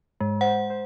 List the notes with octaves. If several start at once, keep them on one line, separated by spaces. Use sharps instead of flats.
G#2 G#3
C5 F#5
C5